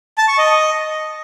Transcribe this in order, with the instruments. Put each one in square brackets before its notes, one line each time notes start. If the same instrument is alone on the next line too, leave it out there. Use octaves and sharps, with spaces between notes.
[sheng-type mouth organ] A5
C#6
D#5